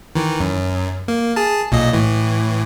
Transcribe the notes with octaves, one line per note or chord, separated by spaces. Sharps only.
D#3 E3
F#2
A#3
G#4 A5
B1 A#2 D#5
A2 E3